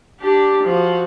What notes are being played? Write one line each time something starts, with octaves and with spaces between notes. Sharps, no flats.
D4 G4
F3 F#4